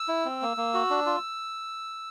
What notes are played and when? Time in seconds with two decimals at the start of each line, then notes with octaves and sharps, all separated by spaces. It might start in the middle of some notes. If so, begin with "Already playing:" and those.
Already playing: E6
0.08 E4
0.25 C4
0.42 A#3
0.57 A#3
0.74 F#4
0.90 D4
1.06 F4